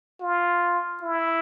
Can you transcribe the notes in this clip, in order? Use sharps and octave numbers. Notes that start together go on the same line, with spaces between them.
F4
E4